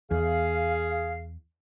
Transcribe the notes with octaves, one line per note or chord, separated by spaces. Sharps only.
E2 G#4 F5